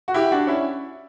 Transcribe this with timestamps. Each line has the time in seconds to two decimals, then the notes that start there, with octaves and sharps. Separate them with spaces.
0.08 F#4
0.14 E4 G4
0.31 D4 F#4
0.47 C#4 E4